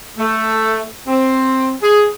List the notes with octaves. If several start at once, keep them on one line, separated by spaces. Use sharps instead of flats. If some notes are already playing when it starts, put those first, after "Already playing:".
A3
C4
G#4